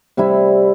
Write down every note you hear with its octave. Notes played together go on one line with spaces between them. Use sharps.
C3 G3 C4 E4